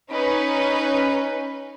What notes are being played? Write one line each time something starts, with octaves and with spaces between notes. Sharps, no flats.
C#4 D#4 B4